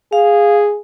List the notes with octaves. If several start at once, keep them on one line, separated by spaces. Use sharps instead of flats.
G#4 F5